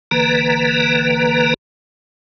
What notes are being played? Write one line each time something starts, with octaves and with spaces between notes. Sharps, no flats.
G1 D3 E3 A#3 B4 A#5